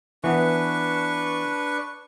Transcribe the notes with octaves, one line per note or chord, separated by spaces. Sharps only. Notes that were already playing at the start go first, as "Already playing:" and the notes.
E3 B3 D4 B4 C#6